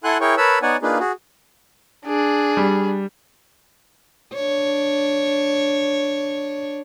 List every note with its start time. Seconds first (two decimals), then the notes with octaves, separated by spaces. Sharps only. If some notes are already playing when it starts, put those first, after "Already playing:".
0.04 E4 A4 F#5 G#5 C6 F#6
0.21 E4 G#4 A#4 C#5 G5 C#6
0.37 A#4 B4 C#5 A5 B5 E6
0.62 B3 D#4 C#5 D5 F#5 G#5
0.82 A#3 D4 D#4 F4 G#4 B4
0.99 F#4 G#4
2.06 D4 G#4
2.57 G3
4.35 D4 C#5